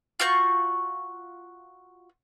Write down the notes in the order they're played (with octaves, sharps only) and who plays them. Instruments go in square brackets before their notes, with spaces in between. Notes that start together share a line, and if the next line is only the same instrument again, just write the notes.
[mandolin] F4 F#4 C#6 G6